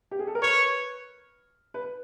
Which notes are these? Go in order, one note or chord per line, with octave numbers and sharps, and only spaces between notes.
G4
G#4
A4
A#4
B4 C#5
B4